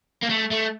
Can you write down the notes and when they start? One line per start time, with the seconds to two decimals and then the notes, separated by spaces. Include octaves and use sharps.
0.23 A#3
0.29 A3
0.51 A3